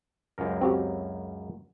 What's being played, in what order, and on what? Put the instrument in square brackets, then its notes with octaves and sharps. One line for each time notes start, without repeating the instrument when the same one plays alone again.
[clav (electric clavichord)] C#2 F#2 A#4
[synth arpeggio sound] C4 F#4 G4